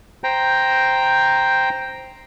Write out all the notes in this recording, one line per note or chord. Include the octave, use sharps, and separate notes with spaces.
C5 G5 A#5